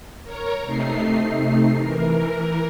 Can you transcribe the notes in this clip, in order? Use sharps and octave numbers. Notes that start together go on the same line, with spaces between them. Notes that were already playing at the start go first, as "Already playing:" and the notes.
A#4 C#5 A#5
C3 A3 D#4 C7
E3 A#4